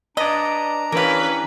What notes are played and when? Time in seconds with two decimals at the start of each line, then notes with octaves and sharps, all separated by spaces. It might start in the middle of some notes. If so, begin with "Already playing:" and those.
0.17 D4 B4 D5 D#5 A#5
0.92 E3 C#4 G4 A#4 B4 F5